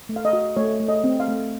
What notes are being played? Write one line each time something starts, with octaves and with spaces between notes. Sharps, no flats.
A3
F5
D#5
F#4
A3 C#5
A3
D#5
C4
F5
A3